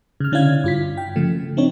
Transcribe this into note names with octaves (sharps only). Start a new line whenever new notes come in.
C#3 F6
D3 C#4 D4 E4 F5 G#6
G2 F4 B6
G5
C#3 F3 A3
C4 D4 D#4 C#5